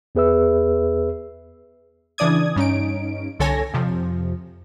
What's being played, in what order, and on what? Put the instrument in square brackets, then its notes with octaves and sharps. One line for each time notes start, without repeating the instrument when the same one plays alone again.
[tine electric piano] E2 B3 G#4 B4 E5 E6
[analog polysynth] C#3 E3 D4 D5 D#6 G#6
G2 C#4 D#4 D7
C2 D3 A4 C#5 G#5 A#6
F2 C3 F3